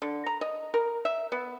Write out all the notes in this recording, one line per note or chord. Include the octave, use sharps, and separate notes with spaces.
D3
A#5
D#5
A#4
E5
B3